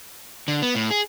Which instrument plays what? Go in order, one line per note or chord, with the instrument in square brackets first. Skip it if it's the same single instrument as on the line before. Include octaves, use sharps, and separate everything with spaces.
[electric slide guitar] D3
B3
A2
G#4